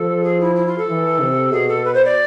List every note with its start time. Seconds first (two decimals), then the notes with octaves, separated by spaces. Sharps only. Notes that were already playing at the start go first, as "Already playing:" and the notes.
Already playing: F3 A4
0.23 G#4
0.40 E4
0.56 E4
0.67 F4
0.78 A4
0.88 E3
1.20 C3
1.52 B2 G#4
1.68 A4
1.85 B4
1.94 C5
2.05 D5